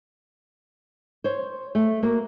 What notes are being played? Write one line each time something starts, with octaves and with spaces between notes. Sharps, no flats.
C5 C#5
A3
A#3 F#4 A#4